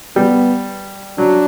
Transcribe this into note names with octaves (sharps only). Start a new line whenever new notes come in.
G3 B3
F#3 D4